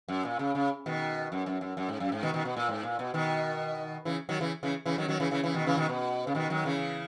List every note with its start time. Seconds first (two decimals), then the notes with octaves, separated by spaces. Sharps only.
0.08 F#2
0.25 A#2
0.39 C#3
0.55 C#3
0.86 B2 D#3
1.32 F#2
1.46 F#2
1.61 F#2
1.77 F#2
1.89 G#2
2.00 F#2
2.12 G#2
2.23 B2 D#3
2.34 B2 D#3
2.45 B2
2.57 A#2
2.69 G#2
2.83 A#2
2.99 B2
3.14 B2 D#3
4.05 C#3 E3
4.29 D#3 F#3
4.40 C#3 E3
4.63 C#3 E3
4.86 C#3 E3
4.98 D#3 F#3
5.08 D#3 F#3
5.20 C#3 E3
5.31 C#3 E3
5.44 C#3 E3
5.54 B2 D#3
5.66 C#3 E3
5.77 B2 D#3
5.89 B2
6.27 C#3
6.35 B2 D#3
6.50 D#3 F#3
6.65 C#3 E3